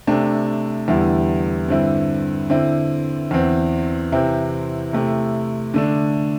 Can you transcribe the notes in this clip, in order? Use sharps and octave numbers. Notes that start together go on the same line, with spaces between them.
C3 A3 D4
E2 D3 G3 E4
G2 D3 C4 E4
D3 C4 E4
E2 E3 C4
C3 E3 C4 E4
C3 A3 E4
D3 A3 D4